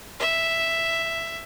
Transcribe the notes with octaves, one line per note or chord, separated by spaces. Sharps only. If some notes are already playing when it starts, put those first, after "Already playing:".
E5